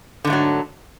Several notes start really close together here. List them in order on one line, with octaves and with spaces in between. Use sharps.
D3 G#2 A3 F#3